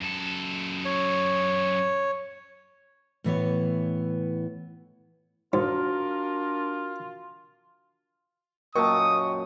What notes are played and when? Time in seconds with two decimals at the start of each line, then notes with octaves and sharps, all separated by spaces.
0.01 F#2 A4
0.85 C#5
3.24 A2 E3 B3 C#5
5.53 G#2 D4 F4 F#4 A#4
8.75 F#2 A#2 A#4 D#5 G5 A5 C#6 D#6